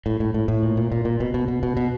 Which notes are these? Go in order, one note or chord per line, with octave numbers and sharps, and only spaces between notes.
A2
A2
A2
A2
A#2
A#2
A#2
A#2
B2
B2
B2
B2
B2